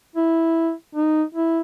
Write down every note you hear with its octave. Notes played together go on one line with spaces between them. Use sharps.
E4
D#4
E4